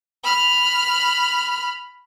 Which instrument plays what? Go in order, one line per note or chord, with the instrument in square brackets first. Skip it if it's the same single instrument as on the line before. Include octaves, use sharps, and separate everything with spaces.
[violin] B5 F6